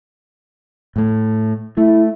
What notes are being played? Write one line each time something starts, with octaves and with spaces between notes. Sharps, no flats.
A2 A3
A3 E4